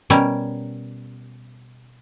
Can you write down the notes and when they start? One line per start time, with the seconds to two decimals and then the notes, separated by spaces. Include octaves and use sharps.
0.10 B2 G3 C#4 A#4